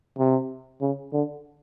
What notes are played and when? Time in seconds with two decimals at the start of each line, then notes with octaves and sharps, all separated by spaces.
0.18 C3
0.81 C#3
1.13 D3